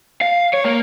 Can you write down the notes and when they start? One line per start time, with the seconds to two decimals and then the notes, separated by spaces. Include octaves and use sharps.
0.21 F5
0.53 C#5
0.65 A#3